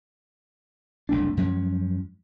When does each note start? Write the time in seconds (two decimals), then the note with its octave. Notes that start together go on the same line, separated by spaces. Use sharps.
1.09 F#1 C2 A3 D4
1.37 F#2 F3 G#3 C#4